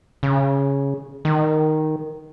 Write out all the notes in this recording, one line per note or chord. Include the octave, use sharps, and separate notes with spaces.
C#3
D#3